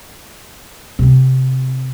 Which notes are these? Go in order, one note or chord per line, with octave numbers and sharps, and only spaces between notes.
C3 C4